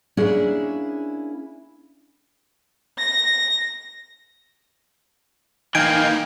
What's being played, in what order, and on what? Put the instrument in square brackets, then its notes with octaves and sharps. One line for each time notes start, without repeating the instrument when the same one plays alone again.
[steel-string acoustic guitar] A#3 C#4 D4 E4 G#4
[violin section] A#6
[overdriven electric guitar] E3 A#3 [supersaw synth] D#4 [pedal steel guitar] F5 G5 G#5 [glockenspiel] D7